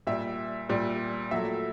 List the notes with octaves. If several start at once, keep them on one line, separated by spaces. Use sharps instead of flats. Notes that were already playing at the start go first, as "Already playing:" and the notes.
A#2 G3 E5
A#2 G3
A#2 F#3 A3 E5